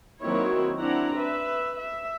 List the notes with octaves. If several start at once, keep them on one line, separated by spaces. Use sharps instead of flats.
D#3 F#3 A#3 C4 E4 C#5
C4 D4 E4 F#5 A#5
B4 E5
E5